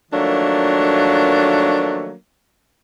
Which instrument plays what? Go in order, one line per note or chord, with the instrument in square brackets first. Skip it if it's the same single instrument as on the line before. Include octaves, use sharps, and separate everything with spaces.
[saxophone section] D#3 F3 F#3 A3 A#3 D4